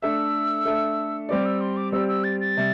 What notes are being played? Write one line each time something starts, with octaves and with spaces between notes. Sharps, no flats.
A3 D4 A4 E5 E6
A3 D4 A4 E5
G3 C4 G4 D5 D6
E6
C6
D6
G3 C4 G4 D5 E6
E6
A6
A6
C3 G3